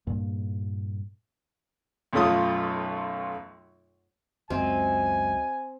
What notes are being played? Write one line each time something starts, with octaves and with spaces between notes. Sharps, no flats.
G2 A#2 A#3
B1 F#2 A3 F4 D#6
C#2 F#2 C4 F#4 D#5 E5 G#5